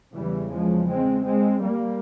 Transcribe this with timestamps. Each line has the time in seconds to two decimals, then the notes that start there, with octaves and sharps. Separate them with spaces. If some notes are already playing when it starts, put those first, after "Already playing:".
0.13 E2 C#3 E3 G3
0.50 F3 G#3
0.87 G#3 C4
1.24 G#3 C4
1.61 G3 A#3